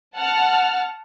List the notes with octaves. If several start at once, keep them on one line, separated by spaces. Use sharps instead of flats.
F#5 A5 F6